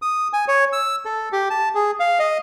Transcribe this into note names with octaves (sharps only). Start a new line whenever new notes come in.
D#6
G#5
C#5
E6
A4
G4
A5
G#4
F5
D#5